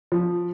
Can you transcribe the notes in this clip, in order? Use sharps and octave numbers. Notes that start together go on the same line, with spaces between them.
F3